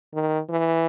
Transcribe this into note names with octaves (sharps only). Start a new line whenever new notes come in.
D#3
E3